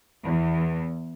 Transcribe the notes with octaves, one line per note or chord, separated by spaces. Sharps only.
E2